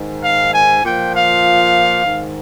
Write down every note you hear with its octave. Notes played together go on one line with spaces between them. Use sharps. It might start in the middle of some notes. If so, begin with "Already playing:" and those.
Already playing: G#2 D#3
F5
G#5
A#2 F3 G5
F5
G#2 D#3